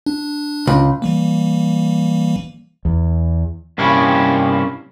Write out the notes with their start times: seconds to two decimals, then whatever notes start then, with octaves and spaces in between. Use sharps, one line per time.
0.06 D4
0.67 C#2
1.02 E3 G3 A#3
2.85 E2
3.78 G2 C3 A#3 C#4 E4